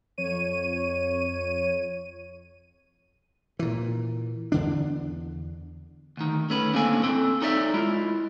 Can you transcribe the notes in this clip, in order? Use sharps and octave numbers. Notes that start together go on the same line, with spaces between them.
F2 C#5 D#7
A#2 E3
E2 D3 D4
D2 D#3
A3 C#4 B4
A2 D3 A#3 C4 A4 G#5
C4 A4
D#4 A4 C#5 D5 E5
G#3 E4 F4